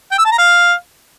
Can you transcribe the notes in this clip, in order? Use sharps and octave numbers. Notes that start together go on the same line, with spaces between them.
G5
E6
A5
A#5
F5